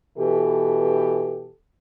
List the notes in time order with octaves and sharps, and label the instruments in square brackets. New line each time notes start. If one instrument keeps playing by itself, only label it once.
[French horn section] B2 E3 G4 A4